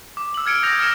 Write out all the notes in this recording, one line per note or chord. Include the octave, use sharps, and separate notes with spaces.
D6
E6 F#7
F6 G#6 C#7 D7
D#6 G6 A#6 F7
F6 G#6 A#6 C#7 E7